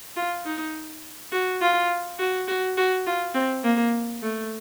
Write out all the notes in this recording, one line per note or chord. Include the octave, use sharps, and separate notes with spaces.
F4
D#4
F#4
F4
F#4
F#4
F#4
F4
C4
A#3
A3